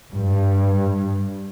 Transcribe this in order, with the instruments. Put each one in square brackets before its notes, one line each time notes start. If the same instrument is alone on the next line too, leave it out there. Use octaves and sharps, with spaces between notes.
[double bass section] G2